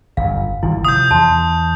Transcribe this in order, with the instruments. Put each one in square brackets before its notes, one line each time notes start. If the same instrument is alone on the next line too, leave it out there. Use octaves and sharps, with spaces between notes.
[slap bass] G1 F#2 [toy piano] F5
[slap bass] G1 D#3 E3 [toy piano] E4
[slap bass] C3 F3 [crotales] D#6 G6
[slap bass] E2 [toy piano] A5 C6